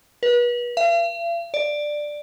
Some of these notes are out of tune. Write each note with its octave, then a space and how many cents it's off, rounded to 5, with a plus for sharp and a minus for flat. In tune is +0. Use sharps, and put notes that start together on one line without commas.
B4 -35
F5 -45
D5 +10